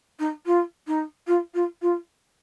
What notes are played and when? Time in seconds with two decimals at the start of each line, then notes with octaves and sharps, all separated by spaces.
0.19 D#4
0.46 F4
0.87 D#4
1.27 F4
1.54 F4
1.82 F4